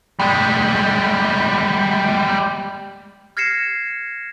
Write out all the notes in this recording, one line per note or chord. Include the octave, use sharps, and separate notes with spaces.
G3 G#3
F6 G#6 A#6 C7 C#7 E7